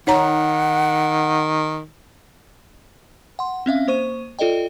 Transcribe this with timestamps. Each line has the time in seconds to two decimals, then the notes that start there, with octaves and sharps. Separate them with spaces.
0.07 D#3 D#4 C#5 F#5 A#5
3.39 F#5 C6
3.66 C4 C#4 E5 F5
3.88 A#3 C5 C#6 D#7
4.39 F4 A4 D5 D#5 G5